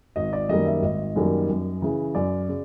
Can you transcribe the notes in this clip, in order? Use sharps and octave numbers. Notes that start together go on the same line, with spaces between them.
G#1 D#5
D5
F#2 D#3 G3 A#3 D#5
E5
G#1 D#5
F#2 D#3 G3 A#3
F#2
C#3 E3
F#2 D5
C#3